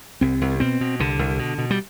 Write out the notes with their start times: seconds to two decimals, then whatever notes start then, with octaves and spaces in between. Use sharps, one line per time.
0.21 C2 C4
0.41 C2
0.60 B2 C4
0.81 B2
0.99 C2 D3
1.19 C2
1.39 B2
1.58 B2
1.71 G3